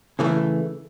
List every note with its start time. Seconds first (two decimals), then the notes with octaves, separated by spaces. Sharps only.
0.19 C#3 E3 A3